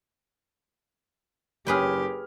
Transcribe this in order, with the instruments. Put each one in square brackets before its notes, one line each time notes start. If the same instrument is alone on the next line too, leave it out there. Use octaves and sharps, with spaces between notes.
[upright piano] F#1 C#4 F6 [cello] G4 [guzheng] G#4 B4 G5